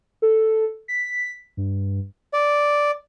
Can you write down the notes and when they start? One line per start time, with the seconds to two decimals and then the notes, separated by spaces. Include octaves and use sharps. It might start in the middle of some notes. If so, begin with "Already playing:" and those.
0.22 A4
0.88 B6
1.57 G2
2.33 D5